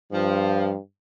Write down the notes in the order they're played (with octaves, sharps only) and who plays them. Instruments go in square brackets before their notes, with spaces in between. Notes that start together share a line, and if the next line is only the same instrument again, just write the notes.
[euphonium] G2 [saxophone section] F3